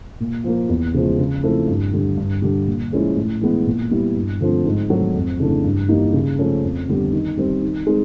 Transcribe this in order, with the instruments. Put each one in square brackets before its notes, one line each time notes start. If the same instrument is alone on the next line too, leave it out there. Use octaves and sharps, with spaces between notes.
[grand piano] A#2
F3 A#3
E2
C#3 F3 G#3
C#3
F3 A3 C4 E4
G2
D3 G3
G2
D3 G3
A#2
F3 G#3 C#4 E4
A2
E3 G#3 B3
A#2
G3 B3 E4
G2
D3 F3 A3 C4
G#2
D#3 F#3 A3 C4
F2
C#3 E3 A3 D4
G2
E3 G3 A#3 D#4
C#3
F3 A3 C#4
F2
D3 G3 B3
D#3
G3 C4
D#3
G#3 C4 D#4